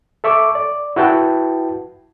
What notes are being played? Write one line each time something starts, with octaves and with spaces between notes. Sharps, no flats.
A4 E5 C#6 D6
D5
E4 F#4 B4 G5 A5